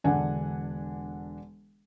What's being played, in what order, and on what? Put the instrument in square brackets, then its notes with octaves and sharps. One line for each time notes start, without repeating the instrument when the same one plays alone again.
[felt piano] E1 D3 D4 F#5 G#5